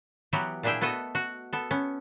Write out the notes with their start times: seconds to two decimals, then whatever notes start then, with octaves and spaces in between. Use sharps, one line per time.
0.33 E3 F#3 B3 F#4 G4
0.63 A#2 D4 E4 G#4 E5 G5
0.81 A3 B3 F#4 A4 D#5
1.15 F#4
1.53 B3 A4
1.71 B3 C#4